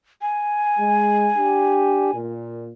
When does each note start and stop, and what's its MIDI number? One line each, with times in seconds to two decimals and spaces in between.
0.21 2.16 80
0.79 1.30 56
1.36 2.12 62
1.36 2.12 67
2.13 2.70 46